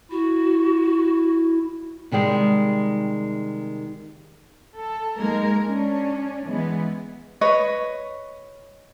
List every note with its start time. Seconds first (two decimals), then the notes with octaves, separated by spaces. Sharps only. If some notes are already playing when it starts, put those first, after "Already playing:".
0.11 E4 F#4
2.12 C3 D#3 G3 G#3
4.75 A4
5.16 G#3 A#3 D#4 A#4
5.67 C#4 D4
6.46 E3 G#3 B3
7.41 B4 C#5 D#5